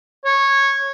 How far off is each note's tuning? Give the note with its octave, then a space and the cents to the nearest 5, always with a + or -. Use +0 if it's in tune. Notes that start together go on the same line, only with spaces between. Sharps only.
C#5 -15